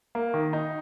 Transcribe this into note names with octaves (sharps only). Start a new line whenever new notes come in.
A#3
D#3
D#4